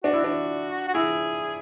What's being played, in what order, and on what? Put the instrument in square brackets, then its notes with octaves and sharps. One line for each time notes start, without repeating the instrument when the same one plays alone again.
[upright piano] D4 [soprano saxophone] F#4
[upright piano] E4
[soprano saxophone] F#4
[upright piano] D4
[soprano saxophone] F#4
[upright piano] E4 [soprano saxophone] G#4